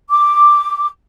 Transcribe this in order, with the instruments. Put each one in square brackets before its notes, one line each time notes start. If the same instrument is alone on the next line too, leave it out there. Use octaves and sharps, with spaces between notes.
[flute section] D6